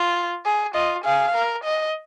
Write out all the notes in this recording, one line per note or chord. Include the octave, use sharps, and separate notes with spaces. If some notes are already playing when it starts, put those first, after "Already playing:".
Already playing: F4
G#4
F4 D#5
G#4 F5
A#4
D#5